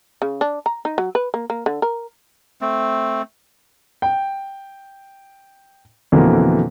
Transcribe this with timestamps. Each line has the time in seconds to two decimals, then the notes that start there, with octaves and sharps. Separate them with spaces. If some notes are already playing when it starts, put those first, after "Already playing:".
0.22 C#3
0.41 D4
0.66 A#5
0.85 D#4
0.98 F#3
1.15 B4
1.34 A#3
1.50 A#3
1.66 D3
1.82 A#4
2.61 A3 C4
4.02 G5
6.12 F2 B2 D3 E3 A#3